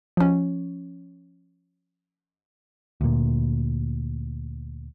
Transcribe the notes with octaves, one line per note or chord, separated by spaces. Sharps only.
F3 C#4
D2 A#2